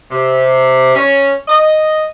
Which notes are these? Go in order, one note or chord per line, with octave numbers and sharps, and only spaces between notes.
C3
C#4
D#5